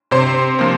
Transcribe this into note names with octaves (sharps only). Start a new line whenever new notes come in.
C3 C5
F3 A#3